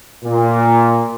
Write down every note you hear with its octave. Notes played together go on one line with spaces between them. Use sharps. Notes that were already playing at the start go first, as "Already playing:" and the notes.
A#2